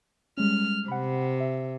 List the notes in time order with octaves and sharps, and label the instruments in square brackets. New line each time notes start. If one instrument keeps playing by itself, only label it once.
[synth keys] G3 G#3 C#4 [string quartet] F6
[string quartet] C3 [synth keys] F#5 B5
[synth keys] E5